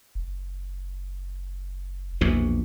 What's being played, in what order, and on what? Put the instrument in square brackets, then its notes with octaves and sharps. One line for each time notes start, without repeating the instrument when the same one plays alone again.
[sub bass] F#1
[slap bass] A#1 E2 B2